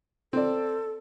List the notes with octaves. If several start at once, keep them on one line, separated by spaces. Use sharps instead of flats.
C4 A4 D5